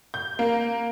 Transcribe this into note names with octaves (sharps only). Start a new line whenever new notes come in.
G6
A#3